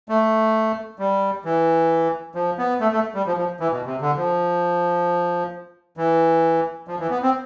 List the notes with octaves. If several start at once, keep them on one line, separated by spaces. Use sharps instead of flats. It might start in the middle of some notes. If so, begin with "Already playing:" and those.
A3
G3
E3
F3
B3
A3
A3
G3
F3
F3
E3
B2
C3
D3
F3
E3
F3
E3
B3
C4